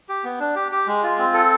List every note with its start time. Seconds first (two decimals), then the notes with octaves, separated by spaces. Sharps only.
0.09 G4
0.24 B3
0.40 D4
0.55 G4
0.72 G4
0.87 G#3
1.03 F4
1.18 C4
1.34 A4